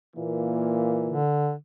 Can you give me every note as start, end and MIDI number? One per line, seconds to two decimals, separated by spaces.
0.16 1.20 46
0.16 1.20 52
0.16 1.20 58
1.10 1.54 50